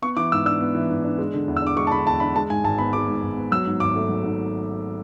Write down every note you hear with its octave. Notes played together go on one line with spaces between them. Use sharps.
B3 C#6
E3 D6
G#2 E6
D4 E6
B3
E3
G#2
D4
G#3
D3
E2
E6
D4 D6
G#3 C#6
A5
D3 B5
E2 A5
D4 B5
G#3 A5
G#2 G#5
G#1 A5
B3 B5
G#3 D6
G#2
G#1
B3
F#3 E6
G#2
G#1 D6
A3
F#3
G#2